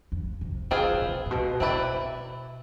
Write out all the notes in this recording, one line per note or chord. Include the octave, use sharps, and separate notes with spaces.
F2
C3
D3 C4 F4 G#4 B4
B2
C3
A2
B2
B2 C4 E4 B4 D5